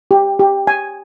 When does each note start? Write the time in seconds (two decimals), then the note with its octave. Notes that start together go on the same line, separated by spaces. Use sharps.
0.11 G4
0.40 G4
0.67 G#5